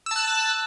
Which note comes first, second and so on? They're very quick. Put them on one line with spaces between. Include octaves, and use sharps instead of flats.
E6 A5 F#6